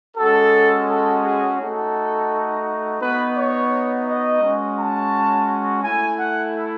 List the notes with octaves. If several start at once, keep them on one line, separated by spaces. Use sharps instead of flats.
G#3 C#4 F#4 A4
A4
G#4
A3 D#4 F#4 A4
B3 D#4 F#4 B4
C#5
D#5
G#3 C#4 F#4
A5
A3 E4 G#5
F#5